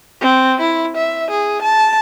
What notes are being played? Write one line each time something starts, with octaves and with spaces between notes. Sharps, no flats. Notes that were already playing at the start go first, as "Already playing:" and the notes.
C4
E4
E5
G#4
A5